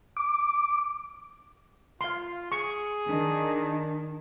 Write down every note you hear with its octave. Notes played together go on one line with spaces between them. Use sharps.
D6
F4 F5 C6
G#4 C#6
D#3 D4